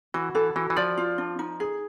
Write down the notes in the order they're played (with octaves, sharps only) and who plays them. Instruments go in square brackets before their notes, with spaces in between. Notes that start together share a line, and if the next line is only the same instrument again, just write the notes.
[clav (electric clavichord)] E3 [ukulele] F#4
[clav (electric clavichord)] E3 [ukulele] A4
[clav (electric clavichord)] E3 [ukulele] F#4
[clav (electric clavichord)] E3
[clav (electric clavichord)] F3 [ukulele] D5
[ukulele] F4
D4
D#4
G#4